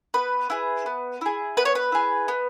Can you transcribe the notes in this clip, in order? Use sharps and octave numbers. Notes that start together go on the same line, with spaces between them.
B3 B4
E4 G#4
B3
E4 G#4
B3 B4
C#5
B4
E4 G#4
B3